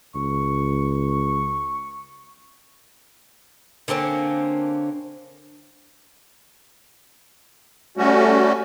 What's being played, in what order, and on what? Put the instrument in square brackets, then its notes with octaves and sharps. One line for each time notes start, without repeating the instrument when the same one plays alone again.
[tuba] C#2 [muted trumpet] C#6
[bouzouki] D3 A#3 C4 C#4
[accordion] G3 A3 C#4 F#4